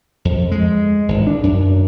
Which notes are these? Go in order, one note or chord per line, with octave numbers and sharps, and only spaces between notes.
F2
G#3
G#1
D4
F#2